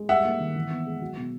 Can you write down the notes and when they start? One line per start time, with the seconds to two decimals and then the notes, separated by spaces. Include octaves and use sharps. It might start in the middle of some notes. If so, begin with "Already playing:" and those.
Already playing: G#3
0.09 G3 E5 F#5
0.25 A#3
0.40 D#3
0.55 E3
0.71 B3
0.86 G#3
1.02 F#3
1.17 B2